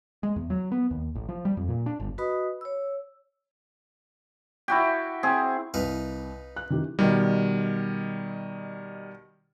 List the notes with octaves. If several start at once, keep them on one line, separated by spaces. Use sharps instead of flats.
G#3
E2
F#3
B3
D#2
A1
F3
G3
F2
A#2
D4
G1
F#4 B4 D#5 B5 D#6
C#5 E6
E4 F#4 G4
C4 G#4
C2 D#4 B4 F5
F#6
D#3 E3 G4
B2 D#3 G3